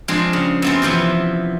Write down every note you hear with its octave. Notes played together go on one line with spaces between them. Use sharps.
F3 G#3 C4 D4
C#3
F#2 B3 C4
C3 E3 F3 B3